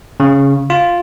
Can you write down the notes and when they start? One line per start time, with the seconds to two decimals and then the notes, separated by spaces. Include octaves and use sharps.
0.20 C#3
0.70 F4